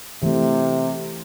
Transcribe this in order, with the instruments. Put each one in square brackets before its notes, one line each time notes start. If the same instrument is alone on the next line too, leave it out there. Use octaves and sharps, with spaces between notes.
[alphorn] C3 [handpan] E3 A3